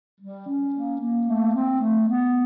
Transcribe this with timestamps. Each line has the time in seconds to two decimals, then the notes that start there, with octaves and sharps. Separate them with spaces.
0.21 G3
0.48 C#4
0.74 A#3
1.01 A#3
1.27 A3
1.54 C4
1.81 A3
2.08 B3